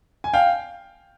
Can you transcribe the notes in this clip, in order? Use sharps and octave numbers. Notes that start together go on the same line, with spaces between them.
G#5
F5 G5